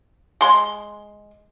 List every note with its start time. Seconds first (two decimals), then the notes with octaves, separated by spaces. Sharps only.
0.41 G#3 C6